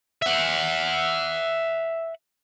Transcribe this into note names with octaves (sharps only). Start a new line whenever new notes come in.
E5 F#5